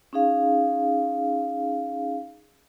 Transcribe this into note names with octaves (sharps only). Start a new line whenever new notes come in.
C#4 D#4 G#4 F5